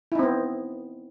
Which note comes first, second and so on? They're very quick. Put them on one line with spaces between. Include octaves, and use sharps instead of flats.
E4 D#4 C4 B3